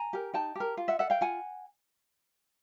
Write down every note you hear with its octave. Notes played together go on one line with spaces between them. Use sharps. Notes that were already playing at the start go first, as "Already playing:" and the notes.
Already playing: G#5 A#5
G4 A#4
D#4 G5 A5
G4 A#4
F4
E5 F#5
A4 E5 F#5
F5 G5
F4 F#5 G#5